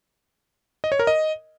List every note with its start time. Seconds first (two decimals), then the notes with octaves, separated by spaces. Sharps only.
0.84 D#5
0.92 C#5
0.99 A#4
1.07 D#5